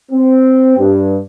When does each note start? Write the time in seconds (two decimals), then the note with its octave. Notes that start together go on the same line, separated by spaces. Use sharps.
0.12 C4
0.78 G2